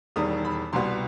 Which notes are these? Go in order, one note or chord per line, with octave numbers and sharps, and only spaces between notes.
E1 E2 D#3 G3 D#6
B5
C2 B2 G3 B3 C6